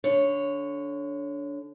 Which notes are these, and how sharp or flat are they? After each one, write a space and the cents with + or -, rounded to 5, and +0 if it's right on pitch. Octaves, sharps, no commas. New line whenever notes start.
D3 -20 C#5 +0